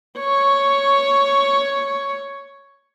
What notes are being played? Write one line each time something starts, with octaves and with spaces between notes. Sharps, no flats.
C#5 C#6